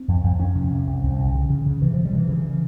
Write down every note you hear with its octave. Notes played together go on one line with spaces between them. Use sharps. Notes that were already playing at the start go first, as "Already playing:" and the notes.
Already playing: C4
F2
F2
F2 C#4
C3
C3
C2
C2
C3
C#3
C#3
C#3
C3 E3
C3 F3
G3
C3 E3
C#3 E3